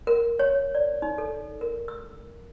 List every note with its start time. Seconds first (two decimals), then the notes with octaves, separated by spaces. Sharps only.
0.07 A#4
0.39 C#5
0.75 D5
1.02 D#4
1.18 A4
1.61 A#4
1.88 E6